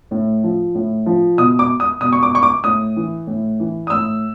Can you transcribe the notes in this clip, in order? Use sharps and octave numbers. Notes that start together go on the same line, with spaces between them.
A2
F3
A2
F3
B2 D#6
D6
D#6
B2 D#6
C#6
D6
C#6
D6
A2 D#6
E3
A2
E3
D#6
A2 E6